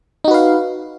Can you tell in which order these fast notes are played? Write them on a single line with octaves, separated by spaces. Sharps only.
D#4 F#4 B4 F5